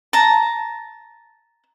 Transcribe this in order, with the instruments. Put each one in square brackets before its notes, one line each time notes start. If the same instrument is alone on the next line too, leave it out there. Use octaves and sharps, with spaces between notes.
[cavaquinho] A5 A#5